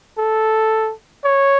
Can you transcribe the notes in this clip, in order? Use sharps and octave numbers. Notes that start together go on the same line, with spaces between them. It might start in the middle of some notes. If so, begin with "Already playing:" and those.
A4
C#5